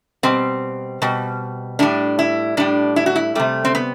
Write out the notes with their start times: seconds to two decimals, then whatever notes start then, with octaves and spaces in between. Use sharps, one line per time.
0.23 B2 G3 C4
1.02 B2 G3
1.79 A2 G3 D4
2.19 E4
2.57 A2 G3 D4
2.96 E4
3.06 F#4
3.16 E4
3.35 C3 G3 A3
3.65 C4
3.75 B3